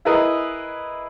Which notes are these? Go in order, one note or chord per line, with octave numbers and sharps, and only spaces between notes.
E4 G#4 A#4 B4 D#5